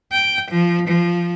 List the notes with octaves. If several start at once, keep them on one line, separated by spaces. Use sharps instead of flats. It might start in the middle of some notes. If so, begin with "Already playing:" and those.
G5
F3
F3